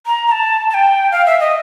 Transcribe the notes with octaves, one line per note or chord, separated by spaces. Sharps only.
A#5
A#5
A5
A5
G5
F5
E5
D#5